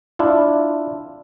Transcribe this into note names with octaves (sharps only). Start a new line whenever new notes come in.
D4 E4 F4